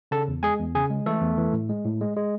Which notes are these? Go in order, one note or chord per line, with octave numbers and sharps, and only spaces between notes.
C#3 A4 A5
E2
G#3 G#4 G#5
E2
C#3 G#4 G#5
G#3
E3 A3 A4
E2
E3
A2
G#3
A2
G#3
G#3